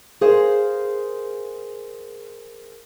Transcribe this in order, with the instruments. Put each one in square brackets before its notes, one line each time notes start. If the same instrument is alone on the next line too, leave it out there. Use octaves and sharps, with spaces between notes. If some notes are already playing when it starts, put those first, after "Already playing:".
[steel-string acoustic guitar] G#4 A#4 C5 F5